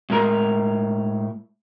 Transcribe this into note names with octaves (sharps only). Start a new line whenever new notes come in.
A2 G#3 A#4 A#5